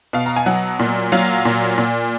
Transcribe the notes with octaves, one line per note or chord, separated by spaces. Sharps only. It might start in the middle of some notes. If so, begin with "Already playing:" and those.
B2 F5
A#5
G#5
F#3 F#5
A#2
F#3 F5
A#2
A#2